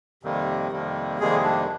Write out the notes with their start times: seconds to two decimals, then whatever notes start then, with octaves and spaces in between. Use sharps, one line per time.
0.23 F2 C3 D#3 G3 A#3
0.71 F2 C3 D#3 G3 A#3
1.19 F2 C3 D#3 G3 G#3 A#3 G#4
1.43 D4